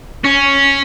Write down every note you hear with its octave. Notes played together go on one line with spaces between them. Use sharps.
C#4